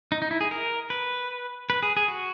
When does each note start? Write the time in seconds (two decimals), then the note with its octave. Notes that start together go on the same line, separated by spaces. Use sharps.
0.12 D#4
0.22 D#4
0.31 E4
0.41 G#4
0.51 A#4
0.90 B4
1.70 B4
1.83 G#4
1.97 G#4
2.08 F#4